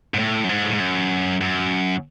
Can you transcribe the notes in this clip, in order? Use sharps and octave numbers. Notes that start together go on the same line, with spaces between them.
G#2
A2
F#2
G#2
A2
G#2
F#2
F#2